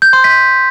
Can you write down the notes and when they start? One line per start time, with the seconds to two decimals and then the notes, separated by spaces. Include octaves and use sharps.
0.02 G6
0.13 C6
0.24 B6